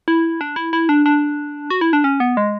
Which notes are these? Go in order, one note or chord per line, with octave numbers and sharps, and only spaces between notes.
E4
D4
E4
E4
D4
D4
F#4
E4
D4
C#4
B3
G#3